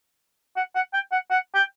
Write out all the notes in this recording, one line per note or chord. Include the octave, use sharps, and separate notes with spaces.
F#5
F#5
G5
F#5
F#5
G5